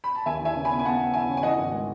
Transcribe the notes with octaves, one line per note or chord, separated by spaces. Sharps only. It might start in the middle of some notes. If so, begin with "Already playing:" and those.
B5
A5
D#2 E5 G#5
E3 E5 G#5
C#3
G#5 B5
B3
G#5
B3 F#5 A5
B3
E3 E5 G#5
C#3
G#5
E3 D#5 F#5
G#1
G#3